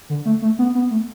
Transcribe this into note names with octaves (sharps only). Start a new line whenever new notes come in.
D3
A3
A3
B3
B3
A3